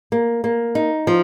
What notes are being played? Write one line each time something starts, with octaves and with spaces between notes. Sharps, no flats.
A#3
A#3
D#4
F3